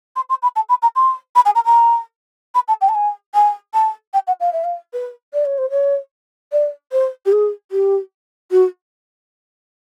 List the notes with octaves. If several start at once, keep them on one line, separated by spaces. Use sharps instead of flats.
C6
C6
B5
A5
B5
A#5
C6
B5
G#5
A#5
A#5
B5
A5
G5
A5
G#5
G#5
A5
G5
F#5
F5
E5
F5
B4
D5
C#5
C5
C#5
D5
C5
G4
G#4
G4
F#4